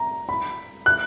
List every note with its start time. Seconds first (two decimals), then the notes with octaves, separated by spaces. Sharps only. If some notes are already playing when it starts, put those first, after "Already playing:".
Already playing: A#5
0.29 B5
0.86 F#6